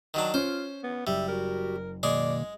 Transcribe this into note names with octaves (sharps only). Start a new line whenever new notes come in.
D#3 F#3 D4
C#4 F4 C5
B3
F#1 G3 E5
F#4 G4 A#4
B2 D#3 G#3 A#3 G#4 D5